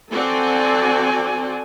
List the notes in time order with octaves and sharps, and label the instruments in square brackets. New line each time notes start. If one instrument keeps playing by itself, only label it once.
[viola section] C4 F#4 D5 [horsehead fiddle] A4 G#5